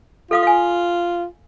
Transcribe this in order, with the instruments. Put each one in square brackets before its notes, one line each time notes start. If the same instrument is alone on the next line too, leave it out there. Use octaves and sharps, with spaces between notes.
[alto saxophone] F4 [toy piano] A4 F5 D#6
[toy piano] F5 G#5